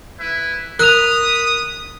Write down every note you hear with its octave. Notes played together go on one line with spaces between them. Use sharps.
E4 B4 E5
A#4 B5 D#6 F#6 F7